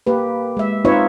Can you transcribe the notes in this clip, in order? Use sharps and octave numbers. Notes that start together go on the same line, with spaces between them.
A#3 G4 B4
G#3 E5
C4 D#4 F4 B4 C#5 E5